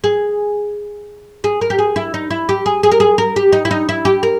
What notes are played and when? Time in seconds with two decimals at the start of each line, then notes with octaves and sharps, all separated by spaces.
0.04 G#4
1.44 G#4
1.61 A#4
1.70 G4
1.79 G#4
1.96 E4
2.14 D#4
2.30 E4
2.49 G4
2.66 G#4
2.83 G#4
2.92 A#4
3.00 G#4
3.18 A#4
3.36 G4
3.52 D#4
3.65 E4
3.71 D#4
3.89 E4
4.05 G4
4.23 A#4